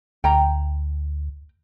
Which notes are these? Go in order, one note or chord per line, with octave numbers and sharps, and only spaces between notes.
D2 G5 A#5